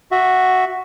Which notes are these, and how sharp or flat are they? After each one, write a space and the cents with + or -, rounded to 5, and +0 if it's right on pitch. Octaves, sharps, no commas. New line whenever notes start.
F#4 +0 E5 +0